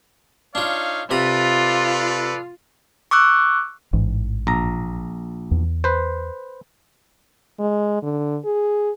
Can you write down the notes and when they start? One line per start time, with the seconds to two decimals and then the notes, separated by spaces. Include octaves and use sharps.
0.55 D4 D#4 F4 C#5 F5
1.11 C3 F4 A4 B4 D5 A#5 B5
3.11 C#6 D6 E6 F#6
3.93 A1 G#2 E3
4.47 A#1 A#5
5.51 E2
5.84 B4 C5
7.59 G#3
8.03 D3
8.45 G#4